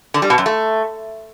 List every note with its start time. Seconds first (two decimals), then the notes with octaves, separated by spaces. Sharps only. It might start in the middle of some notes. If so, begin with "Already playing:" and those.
0.14 D3
0.22 G3
0.30 B2
0.38 F#2
0.46 A3